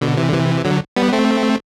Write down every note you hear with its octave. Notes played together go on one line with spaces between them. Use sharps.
B2 D3
C3 E3
D3
C3 E3
D3 F#3
G3 B3
A3 C4